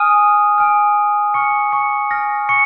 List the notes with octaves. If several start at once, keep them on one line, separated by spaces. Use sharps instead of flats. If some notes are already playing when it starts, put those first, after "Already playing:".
Already playing: G#5 D#6 F6 D#7
G#5 F6
G#5 C#6 F6 C#7
C#6 C#7
G#5 F6 A#6
C#6 C#7